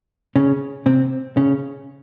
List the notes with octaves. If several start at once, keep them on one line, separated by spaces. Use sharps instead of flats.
C#3 C#4
C3 C4
C#3 C#4